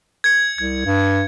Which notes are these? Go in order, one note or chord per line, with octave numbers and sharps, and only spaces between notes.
G#6 C#7
C2 G#6
G2